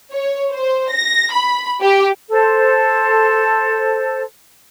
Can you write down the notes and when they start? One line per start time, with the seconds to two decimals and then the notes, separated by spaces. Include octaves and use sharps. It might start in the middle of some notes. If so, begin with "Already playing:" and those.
0.11 C#5
0.52 C5
0.92 A#6
1.33 B5
1.82 G4
2.31 A4 C5